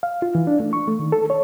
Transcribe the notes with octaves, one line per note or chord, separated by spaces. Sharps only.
F5
F4
E3
D4
A3
C#6
A3
D#3
A4
C#5